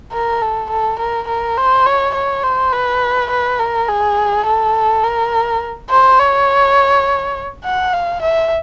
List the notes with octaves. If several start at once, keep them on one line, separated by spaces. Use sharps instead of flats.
A#4
A4
A4
A#4
A#4
C5
C#5
C#5
C5
B4
B4
A#4
G#4
A4
A#4
C5
C#5
F#5
F5
E5